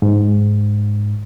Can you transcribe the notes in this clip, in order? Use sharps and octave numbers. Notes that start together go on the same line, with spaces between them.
G#2